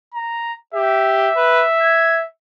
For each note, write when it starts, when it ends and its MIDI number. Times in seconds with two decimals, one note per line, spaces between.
0.14 0.53 82
0.74 1.30 67
0.74 2.25 76
1.36 1.64 71
1.81 2.20 92